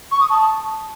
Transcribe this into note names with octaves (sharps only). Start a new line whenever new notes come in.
C#6
D#6
A5